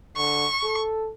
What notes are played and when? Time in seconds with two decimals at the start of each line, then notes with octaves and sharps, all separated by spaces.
0.17 D3 C#6
0.63 A4